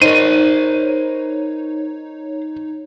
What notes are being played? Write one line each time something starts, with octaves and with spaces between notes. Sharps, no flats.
D#4 A#4 C5 C#5 D#7